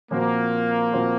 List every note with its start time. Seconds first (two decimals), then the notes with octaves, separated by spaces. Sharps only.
0.11 A#2 F3 A#3 C4 F#4 C5
0.92 A#2 F3 C4 F#4 C5